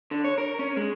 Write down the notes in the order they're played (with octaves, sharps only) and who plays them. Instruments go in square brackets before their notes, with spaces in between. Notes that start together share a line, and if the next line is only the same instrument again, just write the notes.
[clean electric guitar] D3
C#5
A#4
C#4
G#3